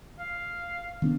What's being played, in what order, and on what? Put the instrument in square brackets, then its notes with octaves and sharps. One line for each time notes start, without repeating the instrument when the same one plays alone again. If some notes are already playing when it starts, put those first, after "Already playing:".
[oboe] F5
[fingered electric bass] D#3 B3 D4